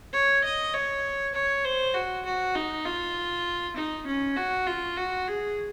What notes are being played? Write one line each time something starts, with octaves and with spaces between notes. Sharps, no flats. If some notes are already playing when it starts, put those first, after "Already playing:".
C#5
D#5
C#5
C#5
C5
F#4
F#4
D#4
F4
D#4
C#4
F#4
F4
F#4
G#4